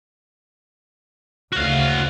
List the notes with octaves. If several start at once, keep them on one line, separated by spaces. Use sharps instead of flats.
D2 C#3 F#4 F5